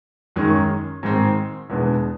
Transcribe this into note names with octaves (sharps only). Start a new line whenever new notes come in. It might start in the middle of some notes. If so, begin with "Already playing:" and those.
F#2 D#3 G#3 C#4
G#2 D#3 G#3 C4
E2 B2 G#3 B3 D4